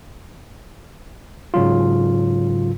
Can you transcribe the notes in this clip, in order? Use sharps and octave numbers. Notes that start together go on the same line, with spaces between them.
G#2 C#3 F#3 F4